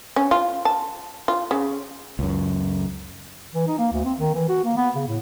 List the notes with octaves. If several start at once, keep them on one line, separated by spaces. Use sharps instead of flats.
C#4
F4
A5
F4
C#3
C#2 F#2
E3
D#4
A#3
D2
C4
D#3
E3
F#4
A#3
B3
C#3
A2